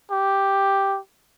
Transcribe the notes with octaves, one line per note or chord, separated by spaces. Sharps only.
G4